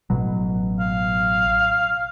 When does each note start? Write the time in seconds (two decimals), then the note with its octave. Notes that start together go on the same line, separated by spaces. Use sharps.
0.10 A1 B2 F#3
0.79 F5